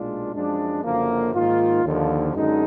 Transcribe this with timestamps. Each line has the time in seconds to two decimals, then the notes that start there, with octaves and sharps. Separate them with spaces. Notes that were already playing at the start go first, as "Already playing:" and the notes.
Already playing: B1 A#2 G#3 D4 F4
0.34 F#2 F3 G#3 D4
0.84 F#1 F#2 D3 F3 A#3
1.34 G#2 D#3 A#3 F4
1.84 D#2 D3 F3
2.34 F#2 D3 G#3 D#4